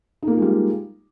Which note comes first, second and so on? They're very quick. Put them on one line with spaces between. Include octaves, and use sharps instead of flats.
D#4 A#3 F4 G#3 G3